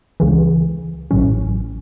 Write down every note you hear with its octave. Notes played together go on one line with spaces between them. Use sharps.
C#2 C#3 E3
A1 A2 F#3 C#4